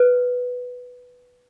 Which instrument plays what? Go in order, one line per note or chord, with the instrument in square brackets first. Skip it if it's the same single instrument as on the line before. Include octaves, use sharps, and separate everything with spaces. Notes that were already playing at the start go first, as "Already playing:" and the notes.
Already playing: [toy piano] B4